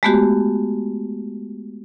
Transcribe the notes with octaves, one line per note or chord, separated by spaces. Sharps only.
G#3 A3 B3 F#4 G4